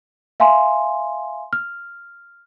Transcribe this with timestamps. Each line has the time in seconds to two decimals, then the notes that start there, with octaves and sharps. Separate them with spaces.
0.40 E5 F5 G#5 C6
1.53 F6